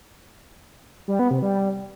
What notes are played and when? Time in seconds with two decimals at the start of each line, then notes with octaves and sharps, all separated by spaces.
1.08 G3
1.19 B3
1.31 C3
1.42 G3